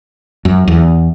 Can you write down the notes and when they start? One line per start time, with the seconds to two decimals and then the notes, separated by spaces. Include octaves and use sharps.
0.45 F#2
0.68 E2